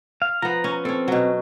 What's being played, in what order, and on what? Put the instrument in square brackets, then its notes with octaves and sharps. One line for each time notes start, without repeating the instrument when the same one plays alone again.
[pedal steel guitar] F5
[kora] F3 B3 [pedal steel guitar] A#5
[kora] C#4
[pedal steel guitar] C4 [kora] C#4 A4
[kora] B2 F#3